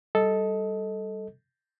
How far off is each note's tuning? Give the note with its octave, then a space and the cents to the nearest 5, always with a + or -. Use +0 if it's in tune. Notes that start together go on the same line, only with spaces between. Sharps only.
G3 +0 A4 -5 D#5 +15